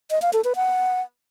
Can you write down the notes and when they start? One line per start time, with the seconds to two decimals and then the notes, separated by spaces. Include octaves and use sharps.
0.11 D#5
0.22 F5
0.33 A4
0.44 B4
0.56 F#5